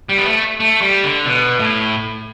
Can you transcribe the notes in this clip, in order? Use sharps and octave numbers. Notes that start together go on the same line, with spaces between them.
G3
B3
A3
A3
G3
D3
B2
A2